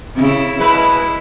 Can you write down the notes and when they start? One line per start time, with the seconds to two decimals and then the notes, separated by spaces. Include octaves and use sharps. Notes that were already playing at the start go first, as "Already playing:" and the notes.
0.16 C#3 E4
0.59 B2 G#3 E4 B4